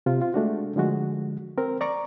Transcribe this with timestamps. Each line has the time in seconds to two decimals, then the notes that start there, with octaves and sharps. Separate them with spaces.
0.06 C3 F4
0.22 F4
0.34 G#3 A3 D4 F#4
0.76 D3 F3 G#3 F#4
1.58 C4 A#4
1.81 D5 A#5 C#6 D6